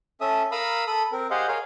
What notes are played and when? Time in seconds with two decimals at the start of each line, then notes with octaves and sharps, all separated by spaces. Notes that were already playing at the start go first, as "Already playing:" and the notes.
0.21 C#4 A4 E5 D#6
0.52 A#4 F5 A#5 B5 D#6 E6
0.87 A4 B5 D#6
1.12 C4 A#4
1.31 G4 G#4 C5 D#5 F5 F#5
1.48 G#4 A#4 C#5 F5